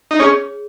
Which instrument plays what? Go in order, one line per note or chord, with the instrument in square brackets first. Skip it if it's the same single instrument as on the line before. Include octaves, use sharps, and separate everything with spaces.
[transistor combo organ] D#4
[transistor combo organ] C#4 [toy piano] G#4 C#5